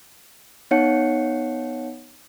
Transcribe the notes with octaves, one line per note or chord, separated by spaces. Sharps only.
B3 D#4 C#5 F#5 C#7